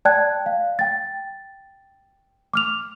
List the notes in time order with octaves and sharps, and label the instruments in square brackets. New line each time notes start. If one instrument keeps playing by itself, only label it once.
[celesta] D5 G5 A5 F#6 G#6
F5
G5 A6
D6 F6 F7